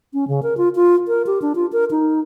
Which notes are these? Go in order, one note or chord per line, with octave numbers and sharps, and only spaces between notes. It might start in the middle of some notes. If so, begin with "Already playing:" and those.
C#4
C#3
A#4
F4
F4
A#4
G4
D4
F4
A#4
D#4